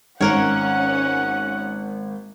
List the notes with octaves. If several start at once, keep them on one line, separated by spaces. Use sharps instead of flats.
G#1 A#3 C#4 A#4 C#5 F#5 F#6